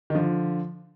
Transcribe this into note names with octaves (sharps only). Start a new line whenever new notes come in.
D#3
D3 F3